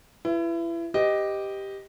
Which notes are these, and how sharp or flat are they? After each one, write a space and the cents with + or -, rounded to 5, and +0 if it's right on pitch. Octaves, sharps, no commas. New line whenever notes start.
E4 +30 B4 +0
G4 +0 B4 +30 D#5 +0